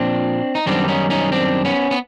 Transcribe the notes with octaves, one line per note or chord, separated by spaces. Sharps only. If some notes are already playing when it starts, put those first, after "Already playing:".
Already playing: A#2 F3 C4 D4
D#4
F#2 D#3 G3 B3 C4 D4
C#4 D#4
C#4 D#4
C4 D4
B3 C#4
B3